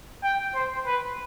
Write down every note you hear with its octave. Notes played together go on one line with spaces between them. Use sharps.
G5
C5
B4